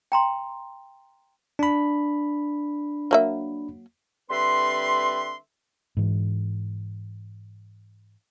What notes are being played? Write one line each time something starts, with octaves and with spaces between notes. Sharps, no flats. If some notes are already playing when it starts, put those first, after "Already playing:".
G5 A#5 C6
D4 B5
F#3 A#3 E5
D3 G3 C4 B4 E5 C6
G#2 E3